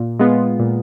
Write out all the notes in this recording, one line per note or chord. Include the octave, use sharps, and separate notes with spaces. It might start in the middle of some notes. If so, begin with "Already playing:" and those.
Already playing: A#2
G#3 B3 F4
A#2